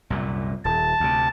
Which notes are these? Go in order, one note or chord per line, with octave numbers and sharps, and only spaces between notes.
C2 F#2 A#2
D#1 A5
D2 C3